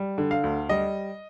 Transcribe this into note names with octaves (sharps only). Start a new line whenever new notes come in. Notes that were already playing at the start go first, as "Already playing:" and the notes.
Already playing: G3
D3
F5
D2
G3 D#5